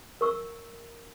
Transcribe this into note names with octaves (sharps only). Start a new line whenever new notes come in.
A#4 C#6 E6